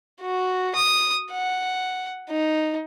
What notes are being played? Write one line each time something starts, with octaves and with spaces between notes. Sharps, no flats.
F#4
D#6
F#5
D#4